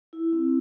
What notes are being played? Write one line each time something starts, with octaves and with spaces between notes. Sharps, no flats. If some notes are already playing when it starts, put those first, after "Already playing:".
E4
C4